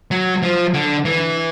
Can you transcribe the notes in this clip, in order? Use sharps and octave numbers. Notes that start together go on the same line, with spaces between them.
F#3
F3
D3
E3